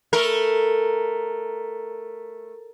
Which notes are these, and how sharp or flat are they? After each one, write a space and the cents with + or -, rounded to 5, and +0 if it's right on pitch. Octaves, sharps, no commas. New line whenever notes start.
A3 +0 A#4 +0